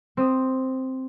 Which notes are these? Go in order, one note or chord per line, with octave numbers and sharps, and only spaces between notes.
C4 D#6